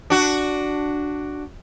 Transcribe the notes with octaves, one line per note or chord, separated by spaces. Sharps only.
D4 F#4